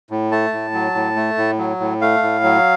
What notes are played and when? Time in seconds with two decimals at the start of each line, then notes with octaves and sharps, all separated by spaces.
0.11 A2
0.31 A3 A5
0.53 A2
0.74 F#3
0.95 A2
1.16 A3
1.38 A2
1.58 F#3
1.80 A2
2.01 A3 F5
2.23 A2
2.44 F#3